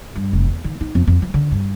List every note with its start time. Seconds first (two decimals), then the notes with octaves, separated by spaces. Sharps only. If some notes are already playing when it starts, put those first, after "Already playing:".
0.15 G2
0.33 F1
0.47 E2
0.64 D#3
0.81 D#4
0.95 F2
1.07 F2
1.22 F3
1.34 D3
1.51 G2